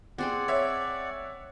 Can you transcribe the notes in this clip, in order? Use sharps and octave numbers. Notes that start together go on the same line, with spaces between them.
C4 G#4 D5 F#5 G5
C#5 E5